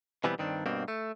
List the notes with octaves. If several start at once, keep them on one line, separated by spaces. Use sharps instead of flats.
B2 E3 G3 B3 C4
G2 D#3 C4 D4
G2 B2 A#3 C4
A3